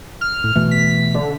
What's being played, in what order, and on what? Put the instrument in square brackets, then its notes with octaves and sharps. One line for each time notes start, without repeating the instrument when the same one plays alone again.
[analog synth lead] F6
[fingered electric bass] A2
B2 E3 A3
[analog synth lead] B6
D3